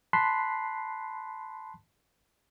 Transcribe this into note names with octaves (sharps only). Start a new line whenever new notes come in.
A5 B5 C6 F#6 B6 C7